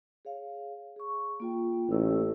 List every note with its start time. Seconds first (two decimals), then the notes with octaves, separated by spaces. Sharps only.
0.25 G#4 C#5 F5
0.96 G#4 C#6
1.40 A#3 F4 G5
1.89 A1 C#4 E6